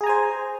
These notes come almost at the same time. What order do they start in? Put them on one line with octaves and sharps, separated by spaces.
G#4 A#5 G#5 C5